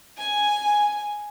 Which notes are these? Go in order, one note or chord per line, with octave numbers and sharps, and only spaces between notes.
G#5